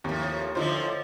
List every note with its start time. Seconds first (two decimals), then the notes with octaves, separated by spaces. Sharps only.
0.04 D#2 A2 F3
0.55 A2 D3 F3 D#4 F4 C5